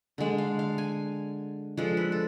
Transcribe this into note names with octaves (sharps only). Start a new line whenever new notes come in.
D3 G#3 D4
F5
F5
G#5
F3 G#3 D4 A4
B4
A4